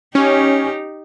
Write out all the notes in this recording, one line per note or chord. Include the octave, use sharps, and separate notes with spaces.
C#4 D#4 G4